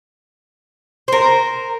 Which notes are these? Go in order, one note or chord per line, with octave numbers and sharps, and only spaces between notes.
A#4 C5